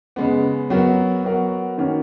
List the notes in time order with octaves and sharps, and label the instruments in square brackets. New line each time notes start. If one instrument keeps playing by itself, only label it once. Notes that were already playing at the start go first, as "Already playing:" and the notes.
[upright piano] C#3 G#3 B3
F#3 B3 F#4 A#4
F#3 B3 F#4 A#4
D#3 A#3 C#4 F#4 A#4